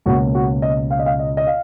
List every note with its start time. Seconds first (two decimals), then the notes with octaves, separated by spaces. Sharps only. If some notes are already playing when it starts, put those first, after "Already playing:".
0.06 C#2 B2 A#3 C#4 F#4
0.35 F#4
0.62 D#5
0.91 F5
0.99 D#5
1.06 F5
1.19 D#5
1.37 D#5
1.47 F5